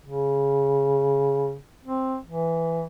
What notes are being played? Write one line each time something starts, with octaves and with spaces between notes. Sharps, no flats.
C#3
C4
E3